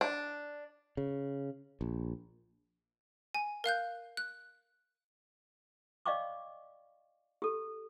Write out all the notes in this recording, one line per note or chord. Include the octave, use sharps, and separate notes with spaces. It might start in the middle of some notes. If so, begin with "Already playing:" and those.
D4
C#3
A#1
G#5
A#4 F5 F#6 G6
F#6
D5 D#5 F5 G5 C#6 D6
G4 A4